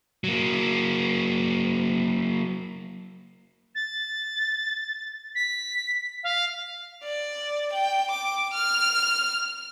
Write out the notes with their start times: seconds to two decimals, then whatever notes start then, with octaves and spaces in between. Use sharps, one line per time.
0.24 F#3 A#3
3.75 A6
5.35 B6
6.23 F5
7.03 D5
7.73 G5
8.11 D6
8.53 F6